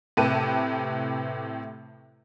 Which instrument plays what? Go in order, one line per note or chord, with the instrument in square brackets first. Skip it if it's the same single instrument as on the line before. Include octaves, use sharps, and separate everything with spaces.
[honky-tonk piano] A2 C3 G4 B4 A5 D#7